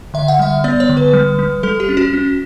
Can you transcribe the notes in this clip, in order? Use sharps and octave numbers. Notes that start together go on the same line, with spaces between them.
D3 E5
F#5
G3 E5
B3 D5
C#5
D3
B4
G3
G3
G3 A4
G4
C#4
F#4
C#4